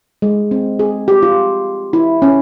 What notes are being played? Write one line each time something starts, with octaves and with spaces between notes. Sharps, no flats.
G#3
C4
G#4
G4
F4
E4
C#4